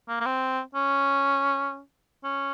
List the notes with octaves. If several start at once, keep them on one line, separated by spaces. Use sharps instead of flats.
A#3
A#3
C4
C#4
C#4